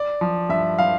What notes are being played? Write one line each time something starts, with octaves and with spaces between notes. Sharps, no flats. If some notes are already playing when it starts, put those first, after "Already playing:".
Already playing: D5
F3
G2 E5
F3 F5